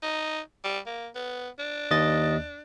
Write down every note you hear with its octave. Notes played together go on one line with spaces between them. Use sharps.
D#4
G3
A#3
B3
D4
D#2 D#5 A6